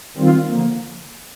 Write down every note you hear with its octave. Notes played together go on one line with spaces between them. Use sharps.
D#3 G3 C4 F4
D3 F3 A#3